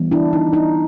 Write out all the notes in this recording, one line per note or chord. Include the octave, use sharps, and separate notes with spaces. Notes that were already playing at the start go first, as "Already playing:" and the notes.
Already playing: E3 G3 B3
D4 E4
D#4
D#4